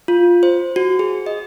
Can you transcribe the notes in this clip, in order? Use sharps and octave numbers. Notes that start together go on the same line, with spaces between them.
F4
C5
F#4
G#4
D#5